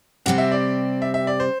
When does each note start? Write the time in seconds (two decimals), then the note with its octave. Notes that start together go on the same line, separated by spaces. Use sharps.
0.26 C3 G3 C4 F#5
0.38 E5
0.52 D5
1.02 E5
1.14 E5
1.27 D5
1.40 C5